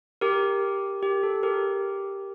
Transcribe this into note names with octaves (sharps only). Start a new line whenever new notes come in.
G4 A#4
G4
A4
G4 A#4